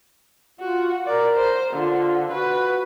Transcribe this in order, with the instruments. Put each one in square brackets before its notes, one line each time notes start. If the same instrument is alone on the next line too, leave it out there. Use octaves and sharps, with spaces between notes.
[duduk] F4 [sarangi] F#4
[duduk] A#4 [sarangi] D5
[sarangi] C5
[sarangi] D3 [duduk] F4
[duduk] F#4 [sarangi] B4